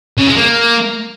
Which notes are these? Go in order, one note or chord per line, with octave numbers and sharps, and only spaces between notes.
C#3
G#3
A#3